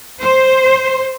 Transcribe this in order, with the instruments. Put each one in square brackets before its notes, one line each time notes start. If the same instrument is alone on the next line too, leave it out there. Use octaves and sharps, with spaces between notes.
[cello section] C5